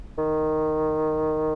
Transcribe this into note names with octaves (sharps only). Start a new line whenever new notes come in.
D#3